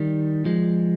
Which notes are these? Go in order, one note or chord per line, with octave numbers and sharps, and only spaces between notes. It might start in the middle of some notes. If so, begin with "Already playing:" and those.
Already playing: D#3 G3
F3 G#3